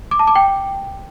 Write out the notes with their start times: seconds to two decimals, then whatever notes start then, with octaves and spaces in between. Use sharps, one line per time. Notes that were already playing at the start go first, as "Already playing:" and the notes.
0.11 D6
0.19 A5
0.27 D6
0.35 G5